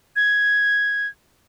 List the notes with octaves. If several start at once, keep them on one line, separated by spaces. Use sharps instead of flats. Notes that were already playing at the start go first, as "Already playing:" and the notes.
G#6